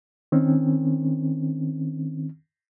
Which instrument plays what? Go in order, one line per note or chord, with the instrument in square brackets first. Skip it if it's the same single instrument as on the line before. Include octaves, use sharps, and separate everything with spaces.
[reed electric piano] D#3 C4 C#4